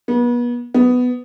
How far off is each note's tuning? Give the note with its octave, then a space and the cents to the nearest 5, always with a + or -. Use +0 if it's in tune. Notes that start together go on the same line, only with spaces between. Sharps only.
B3 -35
B3 +10